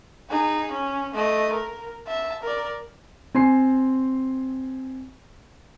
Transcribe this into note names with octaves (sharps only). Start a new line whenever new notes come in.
D#4 G#4
C#4
A3 D#5
A#4
E5 A5
A#4 D5
C4 G#5 C6 C7